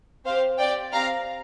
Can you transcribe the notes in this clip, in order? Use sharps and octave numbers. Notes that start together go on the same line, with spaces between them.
C4 G4 C5 F5
C4 G4 D5 G5
C4 G4 F5 A#5